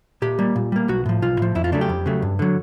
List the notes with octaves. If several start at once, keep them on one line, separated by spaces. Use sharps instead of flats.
A#2 G4
G3 A#3
A#2
G3 A#3
B1 F#4
A2 F3
B1 F4
A2 F3
F2 E4
F4
C#3 F#3 A3 D4
G4
F2
C#3 F#3 A3
G2
D3 F#3